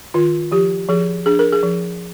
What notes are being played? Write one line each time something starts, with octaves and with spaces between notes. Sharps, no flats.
D#3 F4
F3 G4
F3 G#4
D4 G#4
A#4
G#4
F3